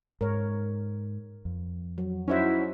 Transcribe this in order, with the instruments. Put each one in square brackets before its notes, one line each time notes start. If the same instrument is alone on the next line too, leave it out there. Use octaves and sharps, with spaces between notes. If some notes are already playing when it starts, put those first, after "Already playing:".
[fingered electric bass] G#2 [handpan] A#4 C#5
[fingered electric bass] F2
[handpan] F#3
[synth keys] C#4 E4 F#4 [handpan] D#4 C5 E5